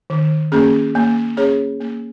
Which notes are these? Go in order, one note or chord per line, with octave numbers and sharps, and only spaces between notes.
D#3
A#3 C#4 G#4
A#3
C#4 G#4 C#5
A#3